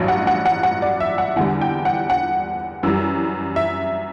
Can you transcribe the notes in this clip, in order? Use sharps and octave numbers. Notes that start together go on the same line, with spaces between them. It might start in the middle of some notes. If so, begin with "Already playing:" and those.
Already playing: A1 G2 F#3
F#5
F#5
F#5
F#5
D5
E5
F#5
E2 D3 G3 F#5
G5
F#5
F#5
F#2 E3 G3
E5